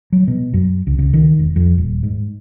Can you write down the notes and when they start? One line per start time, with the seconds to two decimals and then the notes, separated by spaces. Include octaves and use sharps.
0.12 F#3
0.27 B2
0.53 F#2
0.87 C#2
0.99 C#2
1.13 D#3
1.39 E1
1.56 F2
1.78 D#1
2.03 G#2